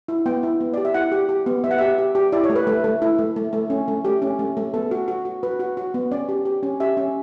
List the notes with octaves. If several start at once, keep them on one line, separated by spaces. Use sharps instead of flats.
E4
B3 G5
E4
B3
G4 D5
E5
E4 F#5
G4
G4
B3
B3 E5
F#5
G4 E5
G4
G4
E4 D5
C#5
A3
B4
A3 B4
A3
E4
A3
A3
A3
C#4
A3
A3 G4
C#4
A3
A3
B3 A4
F#4
F#4
F#4
F#4 B4
F#4
F#4
B3
C#4 D5
G4
G4
C#4
G4 E5
C#4